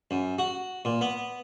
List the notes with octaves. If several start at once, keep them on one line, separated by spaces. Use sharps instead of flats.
F#2
F#4
A#2
B3